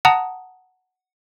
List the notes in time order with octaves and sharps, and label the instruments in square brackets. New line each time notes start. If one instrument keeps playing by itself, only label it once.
[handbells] F#5 A5 A#5 D#6